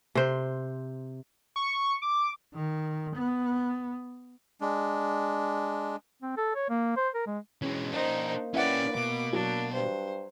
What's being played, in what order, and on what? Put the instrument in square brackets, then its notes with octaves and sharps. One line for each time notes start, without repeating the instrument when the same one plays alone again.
[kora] C3 C5
[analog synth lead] C#6
D6
[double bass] D#3
B3
[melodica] G#3 D4
[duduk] C4
A4
C#5
A#3
C5
A#4
G#3
[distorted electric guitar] E3 G#3 [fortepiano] C#4
[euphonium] A#3 [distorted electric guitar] D4 A#4 [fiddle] D#4 C5
[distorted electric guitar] C#4 G4 [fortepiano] E4 E5 F#5 [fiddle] B4 D5
[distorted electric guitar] B2 [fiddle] D6
[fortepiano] F#3 [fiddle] D4
[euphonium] G2 [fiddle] C5